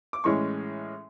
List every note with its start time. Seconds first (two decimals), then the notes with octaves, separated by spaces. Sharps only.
0.13 D6
0.24 A2 E3 G#3 C#4 C#6